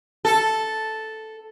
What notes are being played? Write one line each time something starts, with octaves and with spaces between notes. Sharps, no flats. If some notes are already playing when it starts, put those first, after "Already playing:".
A4